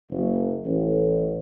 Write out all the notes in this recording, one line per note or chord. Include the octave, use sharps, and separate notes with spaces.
F#1
A1